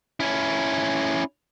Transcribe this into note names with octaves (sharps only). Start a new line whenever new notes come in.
C#4 E4